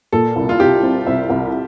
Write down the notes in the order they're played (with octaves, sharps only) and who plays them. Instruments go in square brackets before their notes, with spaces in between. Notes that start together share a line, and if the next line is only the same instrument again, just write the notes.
[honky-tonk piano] A#2 [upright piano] A4
[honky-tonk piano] C2
[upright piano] F4
[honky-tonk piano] C2 [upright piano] G4
[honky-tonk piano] C4
[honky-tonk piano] C2 [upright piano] E5
[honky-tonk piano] C2